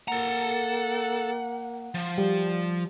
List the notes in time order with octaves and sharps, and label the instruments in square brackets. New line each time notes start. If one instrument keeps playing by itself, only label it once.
[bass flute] A#3 [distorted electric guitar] A4 A#5 [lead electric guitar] F#5
[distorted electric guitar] F3
[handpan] G3